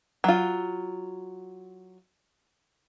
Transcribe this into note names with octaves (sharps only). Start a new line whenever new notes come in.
F#3 F4